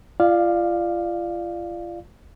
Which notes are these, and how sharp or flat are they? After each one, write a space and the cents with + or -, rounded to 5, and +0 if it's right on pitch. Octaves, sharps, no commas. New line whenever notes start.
F4 -30 D5 +20 F5 +0